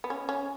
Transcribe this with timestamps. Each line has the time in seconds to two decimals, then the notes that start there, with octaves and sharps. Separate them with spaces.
0.04 B3
0.10 C#4
0.29 C#4